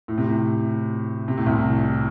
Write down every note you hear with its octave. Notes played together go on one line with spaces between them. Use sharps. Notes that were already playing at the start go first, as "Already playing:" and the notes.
A2
C3
A2
C3
A2
C2 C3